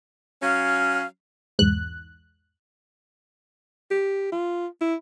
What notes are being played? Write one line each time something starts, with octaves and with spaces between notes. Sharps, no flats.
F#3 C#4 F5
B1 E2 G#2 F#6
G4
F4
E4